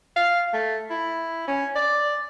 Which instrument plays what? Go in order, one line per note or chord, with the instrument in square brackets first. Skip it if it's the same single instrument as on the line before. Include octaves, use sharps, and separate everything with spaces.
[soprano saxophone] F5
A3
E4
C#4
D5